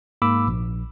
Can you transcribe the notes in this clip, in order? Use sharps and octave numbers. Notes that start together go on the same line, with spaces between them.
G#2 A#3 B5 D6 E6
A#1